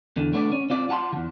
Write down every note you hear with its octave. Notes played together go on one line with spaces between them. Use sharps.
E2 D3
A3 B3 D4 C5 D5
C#4
C4 F4 D5
F4 F#5 A5 A#5 C6
E2 D#3